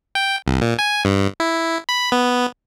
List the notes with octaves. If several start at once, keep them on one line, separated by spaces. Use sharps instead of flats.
G5
C2
A#2
G#5
G2
E4
B5
B3